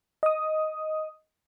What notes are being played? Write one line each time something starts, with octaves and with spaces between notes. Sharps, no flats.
D#5 D#6